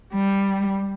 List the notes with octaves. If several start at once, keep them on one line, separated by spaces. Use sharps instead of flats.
G3